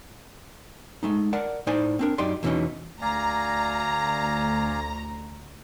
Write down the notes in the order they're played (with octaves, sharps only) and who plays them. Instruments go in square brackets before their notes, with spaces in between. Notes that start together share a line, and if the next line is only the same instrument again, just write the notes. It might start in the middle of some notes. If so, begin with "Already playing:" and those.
[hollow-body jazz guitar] G#3 A3 D#4
A#4 D5 F#5 A5
A2 D#4 C5 D5 G#5
C4 D4 A#4
F#2 D#4 G4 D5 C6
E2 B2 E3 G3 C#4 D#4
[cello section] D2 [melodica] D5 F5 G#5 [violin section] A#5